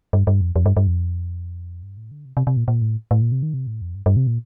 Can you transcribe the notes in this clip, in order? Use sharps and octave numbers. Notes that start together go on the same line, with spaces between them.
G2
G2
F2
F2
G2
G2
F2
G2
A2
D3
C3
C3
C3
A#2
A#2
A2
A2
A#2
C3
D#3
C3
A2
F2
G2
G2
C3
A#2